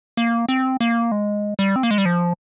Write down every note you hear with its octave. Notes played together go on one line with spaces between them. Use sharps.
A#3
C4
A#3
G#3
G3
C4
A#3
G#3
G3
F3